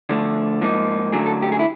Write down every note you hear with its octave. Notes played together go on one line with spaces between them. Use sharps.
D3 F3 A3
G#2 F3 A#3 D#4
F#2 D3 F#3 A3 G#4
A4
G4
G#4
E4